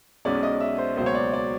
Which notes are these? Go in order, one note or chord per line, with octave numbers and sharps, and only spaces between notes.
B1 B2 G#3 C#4 D5
D#5
E5
C5
C#2 B2 F#3 A#3 C5
C#5
D5
D5